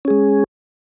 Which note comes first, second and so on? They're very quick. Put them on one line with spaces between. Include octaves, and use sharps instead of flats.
C#4 G#4 G#3